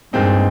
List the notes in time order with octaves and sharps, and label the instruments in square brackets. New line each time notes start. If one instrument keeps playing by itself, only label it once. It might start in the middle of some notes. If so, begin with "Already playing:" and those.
[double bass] G2 [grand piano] A#2 G#3 C4 D#4